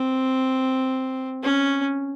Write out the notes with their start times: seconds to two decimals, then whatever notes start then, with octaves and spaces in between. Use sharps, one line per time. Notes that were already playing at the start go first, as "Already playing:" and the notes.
Already playing: C4
1.43 C#4